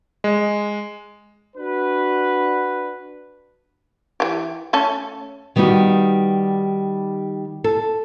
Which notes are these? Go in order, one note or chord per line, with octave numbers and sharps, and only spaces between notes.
G#3
D4 F#4 B4
E3 G4
A3 C#4 A4
D#3 G3 B3 D#4 F#4
A4